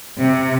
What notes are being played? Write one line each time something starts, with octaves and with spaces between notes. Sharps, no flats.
C3